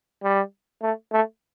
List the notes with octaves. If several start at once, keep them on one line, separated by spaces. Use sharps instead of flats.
G3
A3
A3